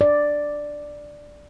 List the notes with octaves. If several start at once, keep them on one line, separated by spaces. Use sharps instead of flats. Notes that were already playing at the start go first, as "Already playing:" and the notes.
D5